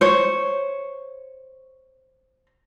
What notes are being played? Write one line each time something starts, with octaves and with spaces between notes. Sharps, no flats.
C5 C#5